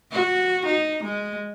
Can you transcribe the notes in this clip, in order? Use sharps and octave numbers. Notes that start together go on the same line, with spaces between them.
F#4
D#4
G#3